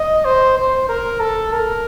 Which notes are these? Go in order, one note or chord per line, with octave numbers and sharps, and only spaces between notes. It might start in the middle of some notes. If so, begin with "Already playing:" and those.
Already playing: D#5
C5
C5
A#4
A4
A#4